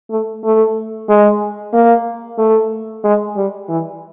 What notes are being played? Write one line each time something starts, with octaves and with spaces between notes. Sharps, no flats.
A3
A3
G#3
A#3
A3
G#3
G3
E3